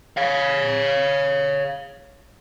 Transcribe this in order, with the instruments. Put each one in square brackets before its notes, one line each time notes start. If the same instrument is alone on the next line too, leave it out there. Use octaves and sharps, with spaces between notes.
[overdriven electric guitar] C#5 F5